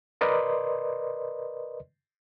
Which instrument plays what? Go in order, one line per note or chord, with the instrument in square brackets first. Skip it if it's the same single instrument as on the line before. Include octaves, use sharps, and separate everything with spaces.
[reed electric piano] A#4 B4 D5 D#5 C6